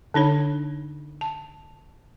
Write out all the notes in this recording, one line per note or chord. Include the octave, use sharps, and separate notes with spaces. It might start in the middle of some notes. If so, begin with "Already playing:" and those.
D3 D4 D#4 C#5
A5